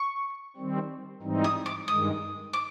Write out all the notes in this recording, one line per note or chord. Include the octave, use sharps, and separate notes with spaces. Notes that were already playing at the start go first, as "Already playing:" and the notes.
Already playing: C#6
D#3 G3 C4
G#2 E3 G3 C4 D#4
D#6
D6
G2 D#3 G#3 D#6
D6